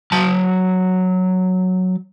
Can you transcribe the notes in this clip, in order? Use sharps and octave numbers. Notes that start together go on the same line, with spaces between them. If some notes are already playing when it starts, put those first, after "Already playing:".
F#3 A5